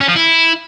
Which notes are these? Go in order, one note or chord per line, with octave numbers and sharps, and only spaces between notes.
C#4
F3
E4